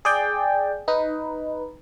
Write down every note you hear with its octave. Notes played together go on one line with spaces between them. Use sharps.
G#4 D5 G5
D#4 B4